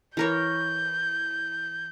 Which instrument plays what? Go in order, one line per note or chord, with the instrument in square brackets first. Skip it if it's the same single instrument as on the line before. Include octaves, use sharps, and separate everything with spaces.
[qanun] E3 A#4 C#5 [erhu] G6